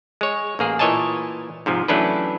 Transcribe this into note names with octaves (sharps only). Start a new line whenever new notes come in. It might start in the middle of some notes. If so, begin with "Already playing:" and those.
G#3 C#5
A1 A#3 G#4
A#2 E3 C#5 D#5 G#5 A5
G#2 C3 F3
E3 F#3 A3 C#4 D4 B4